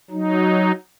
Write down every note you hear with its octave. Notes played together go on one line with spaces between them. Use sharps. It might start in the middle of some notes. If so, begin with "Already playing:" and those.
F#3 D#4